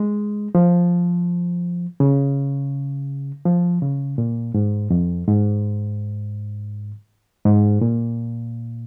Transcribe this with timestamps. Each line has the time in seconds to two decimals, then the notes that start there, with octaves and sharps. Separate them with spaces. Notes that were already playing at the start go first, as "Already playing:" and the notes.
Already playing: G#3
0.55 F3
2.00 C#3
3.45 F3
3.82 C#3
4.18 A#2
4.54 G#2
4.90 F2
5.27 G#2
7.45 G#2
7.81 A#2